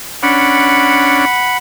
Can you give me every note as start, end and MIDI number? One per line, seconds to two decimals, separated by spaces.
0.23 1.25 61
0.23 1.25 62
0.23 1.57 78
0.23 1.57 83